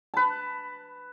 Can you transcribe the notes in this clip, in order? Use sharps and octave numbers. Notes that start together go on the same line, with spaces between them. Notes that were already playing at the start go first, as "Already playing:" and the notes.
B4 A5